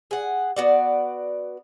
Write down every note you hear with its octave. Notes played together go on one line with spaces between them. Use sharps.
G#4 F#5
B3 F#4 D5